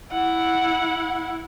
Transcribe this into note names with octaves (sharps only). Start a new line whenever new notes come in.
E4 F#5